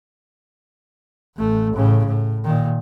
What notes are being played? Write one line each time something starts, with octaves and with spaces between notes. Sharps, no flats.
A1 A3
A2 C#3
A2
A#2 D#3